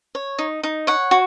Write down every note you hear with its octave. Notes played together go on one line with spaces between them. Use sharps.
C#5
D#4
D#4
C#5 F#5
F#4